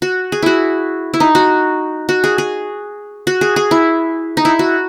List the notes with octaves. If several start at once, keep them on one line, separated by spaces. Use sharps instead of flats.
F#4
G#4
E4 F#4
E4
D#4
F#4
F#4
G#4
G#4
F#4
G#4
G#4
E4
D#4
E4
F#4